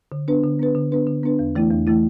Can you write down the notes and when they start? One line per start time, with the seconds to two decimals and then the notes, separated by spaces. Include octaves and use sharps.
0.12 D3
0.28 B3 D4 B4
0.44 D3
0.59 B3 D4 B4
0.75 D3
0.92 B3 D4 B4
1.07 D3
1.23 B3 D4 B4
1.39 E2
1.56 E3 A3 E4
1.71 E2
1.87 E3 A3 E4